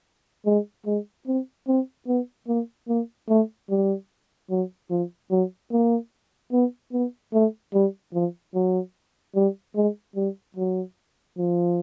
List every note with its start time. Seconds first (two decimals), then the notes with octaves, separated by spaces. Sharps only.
0.46 G#3
0.86 G#3
1.27 C4
1.68 C4
2.08 B3
2.48 A#3
2.88 A#3
3.29 A3
3.70 G3
4.50 F#3
4.91 F3
5.31 F#3
5.72 A#3
6.53 B3
6.93 B3
7.34 A3
7.74 G3
8.14 F3
8.55 F#3
9.35 G3
9.76 G#3
10.16 G3
10.57 F#3
11.38 F3